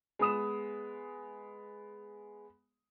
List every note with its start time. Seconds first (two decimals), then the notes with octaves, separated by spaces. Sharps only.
0.19 G#3 B3 D#6 E7